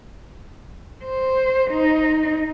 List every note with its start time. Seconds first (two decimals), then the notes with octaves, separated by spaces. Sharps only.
1.04 C5
1.71 D#4